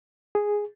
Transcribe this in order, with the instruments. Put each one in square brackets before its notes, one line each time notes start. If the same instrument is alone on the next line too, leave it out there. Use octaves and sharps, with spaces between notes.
[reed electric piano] G#4